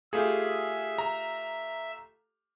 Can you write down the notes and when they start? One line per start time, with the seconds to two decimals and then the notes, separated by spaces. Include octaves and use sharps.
0.13 A3 F4 G4 G#4 E5
0.98 A#5